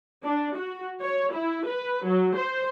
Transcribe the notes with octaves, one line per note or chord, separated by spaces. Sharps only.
D4
F#4
C#5
E4
B4
F#3
C5